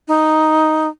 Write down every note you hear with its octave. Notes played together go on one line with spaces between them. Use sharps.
D#4